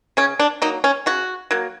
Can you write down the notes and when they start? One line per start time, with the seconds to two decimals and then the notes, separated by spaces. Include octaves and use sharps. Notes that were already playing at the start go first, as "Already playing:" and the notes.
0.17 C#3 C#4
0.39 D4
0.62 F#3 A#3 D#4
0.84 C#4
1.06 C#3 F#4
1.51 F#3 A#3